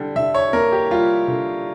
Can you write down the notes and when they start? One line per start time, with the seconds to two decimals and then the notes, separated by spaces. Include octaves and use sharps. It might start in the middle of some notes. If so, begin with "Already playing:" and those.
Already playing: D3 G3
0.16 D3 E5
0.35 C#5
0.53 A#3 A#4
0.72 G4
0.90 G3 F4
1.28 D3